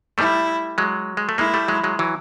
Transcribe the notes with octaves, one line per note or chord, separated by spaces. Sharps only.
G3 A3 E4
F#3 G#3
G#3
A3
G#3 A#3 E4
G3 A3
F#3 G#3
F#3 G#3
E3 F#3